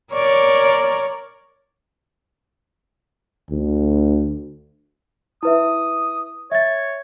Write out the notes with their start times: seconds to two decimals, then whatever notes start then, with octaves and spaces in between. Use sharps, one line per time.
0.13 A#4 C#5 D5
3.50 D2
5.43 E4 B4 E5 D#6
6.52 C#5 E5 A6